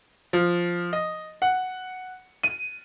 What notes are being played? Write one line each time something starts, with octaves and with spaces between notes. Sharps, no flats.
F3
D#5
F#5
D#7